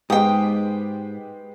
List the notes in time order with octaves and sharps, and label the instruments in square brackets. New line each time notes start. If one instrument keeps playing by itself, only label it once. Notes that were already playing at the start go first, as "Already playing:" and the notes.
[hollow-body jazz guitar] G#2 [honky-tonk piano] G#3 B3 G4 [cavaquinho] G5 D#6